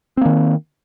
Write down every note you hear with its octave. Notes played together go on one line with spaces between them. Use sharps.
D#3 A#3 C4